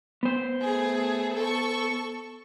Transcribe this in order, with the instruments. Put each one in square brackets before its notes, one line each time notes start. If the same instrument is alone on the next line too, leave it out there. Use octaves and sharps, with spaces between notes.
[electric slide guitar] B3 C5
[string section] A3 G#4
A4 C#6